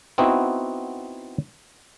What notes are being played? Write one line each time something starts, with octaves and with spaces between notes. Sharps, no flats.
B3 C4 D#4 E4 F#4